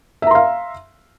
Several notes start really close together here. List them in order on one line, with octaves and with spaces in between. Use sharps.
E5 A#5 C6 F5